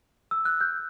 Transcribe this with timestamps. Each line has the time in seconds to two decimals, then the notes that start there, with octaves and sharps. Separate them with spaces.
0.31 E6
0.45 F#6
0.61 G6